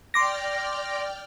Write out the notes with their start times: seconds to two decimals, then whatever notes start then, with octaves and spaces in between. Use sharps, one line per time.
0.14 D5 G5 C6 D6 F6 A#6